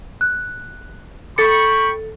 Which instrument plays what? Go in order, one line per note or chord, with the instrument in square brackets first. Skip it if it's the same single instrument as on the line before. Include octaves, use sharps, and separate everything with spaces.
[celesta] F#6
[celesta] A4 A6 C#7 [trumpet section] G5 B5 C#6